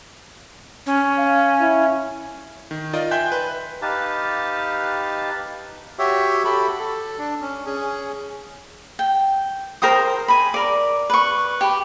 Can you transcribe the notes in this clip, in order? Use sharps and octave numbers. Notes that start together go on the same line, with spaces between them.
C#4
F5
E4
D#3
D#4 F4 A#4 D5 D#5
E5 G5 G#5 C6 F#6 G6
B4
D#4 G4 B4 F5 A5
F#4 G4 C#5 E5
F#4 G4 A4 B5
A4
D4
C#4
C#4 G#4
G5
A#4 C5 G5 D#6
G#5 B5
A#4 D5
B4 C#6
G4 B4